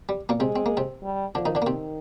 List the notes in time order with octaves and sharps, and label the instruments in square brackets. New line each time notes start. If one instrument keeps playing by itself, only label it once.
[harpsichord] G3
A#2 A#3
[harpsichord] C3 C4 [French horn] G#3
[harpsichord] C4
A#3
C3 C4
[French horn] G3
[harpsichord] D3 D4 [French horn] F3
[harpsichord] D#3 D#4
D3 D4
A#3
[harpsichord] C3 C4 [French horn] D#3